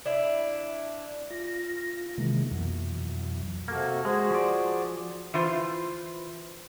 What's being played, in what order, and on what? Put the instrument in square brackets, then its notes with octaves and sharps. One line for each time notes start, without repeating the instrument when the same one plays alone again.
[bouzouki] D4 E4
[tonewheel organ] F4 A#6
C3 D#3 E3 G#3 A#3
F2 B2 E3 F#3
[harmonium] C3 F#4 A4 [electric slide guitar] A#3
[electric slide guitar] G#3 [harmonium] F#4 G#4 C5
[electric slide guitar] F3 D5
[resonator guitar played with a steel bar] E3 F4 C5